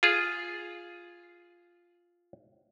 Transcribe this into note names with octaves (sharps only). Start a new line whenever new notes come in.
F4 G#4